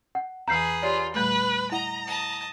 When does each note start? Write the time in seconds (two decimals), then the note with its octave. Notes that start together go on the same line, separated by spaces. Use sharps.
0.15 F#5
0.48 E2 E3 G#4 B4 A#5 G6 C7
0.83 F4 G4 C#5 D5
1.14 A#2 G3 A3 B4 F#6
1.72 E4 D#5 F#5 A#5
2.07 D#5 A5